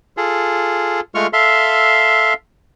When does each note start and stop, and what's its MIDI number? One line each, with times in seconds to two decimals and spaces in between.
0.17 1.00 65
0.17 1.00 68
0.17 1.00 69
1.15 1.27 56
1.15 1.27 57
1.15 1.27 65
1.15 1.27 85
1.15 1.27 89
1.33 2.34 69
1.33 2.34 76
1.33 2.34 77
1.33 2.34 84